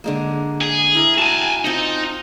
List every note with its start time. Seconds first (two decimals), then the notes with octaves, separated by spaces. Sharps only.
0.04 D3 G#3 A#3
0.61 G#4
0.95 E4 A#4 D6
1.18 F#4 G#5 A5
1.65 C4 D#4 F4 A5